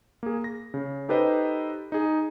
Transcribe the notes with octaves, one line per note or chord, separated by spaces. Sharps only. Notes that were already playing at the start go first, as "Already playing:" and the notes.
A#3 G#4
A#6
C#3
D#4 G4 A4 B4 C5 D#5
D#4 G#4